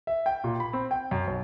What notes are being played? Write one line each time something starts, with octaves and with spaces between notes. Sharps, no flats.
E5
G5
A#2
B5
C4
G5
F#2
B1